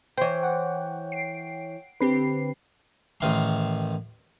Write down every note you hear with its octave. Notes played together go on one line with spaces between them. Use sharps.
E3 C5 C#5 G5
F#5
C7 D7
D3 C4 G4 B4 C7
A1 D#3 C6